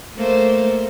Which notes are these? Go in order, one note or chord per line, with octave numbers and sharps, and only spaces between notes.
A3 A#3 C5